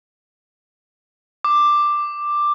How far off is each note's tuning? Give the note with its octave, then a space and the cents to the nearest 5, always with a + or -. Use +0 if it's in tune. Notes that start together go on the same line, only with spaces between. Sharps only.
D6 +10